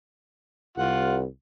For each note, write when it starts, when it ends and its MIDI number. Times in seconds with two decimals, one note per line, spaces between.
0.78 1.26 36
0.78 1.19 65
0.78 1.19 78